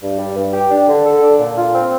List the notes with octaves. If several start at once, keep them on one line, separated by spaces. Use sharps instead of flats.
G2
G3
G2
G4
D4
D3
A4
D4
A#2
F4
C4